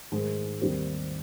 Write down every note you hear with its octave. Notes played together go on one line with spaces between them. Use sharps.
G#2 D#3 G#3
D#2 D#3 G3 C4 G4